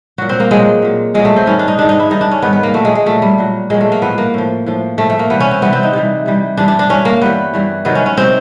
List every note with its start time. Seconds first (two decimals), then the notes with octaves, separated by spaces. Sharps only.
0.18 A#2 F#3 F#4
0.29 C4
0.40 A#3
0.50 A#2 F#3 G#3
0.82 A#2 F#3
1.14 A#2 F#3 G#3
1.25 A3
1.36 C4
1.46 G#2 D#3 G3 C#4
1.59 D4
1.68 D#4
1.78 G#2 D#3 G3 D4
1.89 D#4
2.00 E4
2.10 G#2 D#3 G3 D#4
2.21 D4
2.31 C#4
2.42 G#2 D#3 G3 B3
2.53 B3
2.63 A#3
2.74 A#2 F#3 A3
2.85 G#3
2.95 G#3
3.06 A#2 F#3 A3
3.22 G3
3.38 A#2 F#3
3.70 A#2 F#3 G#3
3.81 A3
3.92 A#3
4.02 A2 F3 B3
4.18 A#3
4.34 A2 F3
4.66 A2 F3
4.98 A2 F3 A3
5.10 A3
5.19 A#3
5.30 C3 E3 G3 B3
5.40 C#4
5.51 C4
5.62 C3 E3 G3 B3
5.73 C4
5.83 D#4
5.93 C3 E3 G3
6.26 C3 E3 G3
6.57 G2 E3 G3 D4
6.68 D4
6.79 D4
6.89 G2 E3 G3 C#4
7.05 A#3
7.21 G2 E3 G3 B3
7.54 G2 E3 G3
7.85 C3 D#3 F#3 B3
7.95 C#4
8.06 C#4
8.17 C3 D#3 F#3 C4